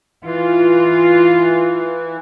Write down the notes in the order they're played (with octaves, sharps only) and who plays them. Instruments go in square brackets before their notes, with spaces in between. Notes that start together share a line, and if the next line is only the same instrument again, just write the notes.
[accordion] E3 [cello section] F4